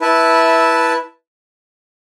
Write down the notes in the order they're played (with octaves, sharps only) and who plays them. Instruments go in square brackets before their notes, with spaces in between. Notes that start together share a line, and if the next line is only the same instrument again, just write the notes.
[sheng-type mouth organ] E4 B4 E5 A5